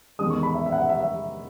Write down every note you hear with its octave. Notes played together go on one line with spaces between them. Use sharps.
E2 D#3 G#3 D#6
C#6
B5
E5
E5
F#5
E5
E5
E5